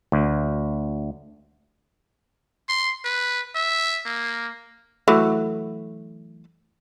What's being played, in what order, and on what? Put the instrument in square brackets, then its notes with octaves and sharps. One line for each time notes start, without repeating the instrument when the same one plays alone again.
[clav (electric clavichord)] D2
[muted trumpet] C6
B4
E5
A#3
[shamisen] E3 F#3 A3